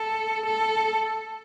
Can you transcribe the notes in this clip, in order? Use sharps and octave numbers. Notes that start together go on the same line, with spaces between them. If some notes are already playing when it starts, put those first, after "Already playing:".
Already playing: A4
A4